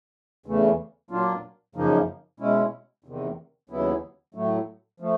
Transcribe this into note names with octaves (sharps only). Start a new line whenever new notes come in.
E2 C#3 E3 A3
A#2 F#3 A#3 D4 F4
F#2 C#3 F3 A#3 D#4
B2 G#3 C#4 E4
E2 C3 D#3
D#2 C#3 F#3 B3 E4
A2 F#3 A3
F3 A3